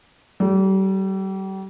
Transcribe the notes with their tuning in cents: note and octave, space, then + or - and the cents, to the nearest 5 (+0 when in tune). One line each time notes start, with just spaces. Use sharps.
G3 -35 G#4 +35